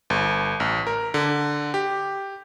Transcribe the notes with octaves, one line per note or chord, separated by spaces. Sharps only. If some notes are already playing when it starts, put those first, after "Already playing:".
G1
A1
A#4
D3
G4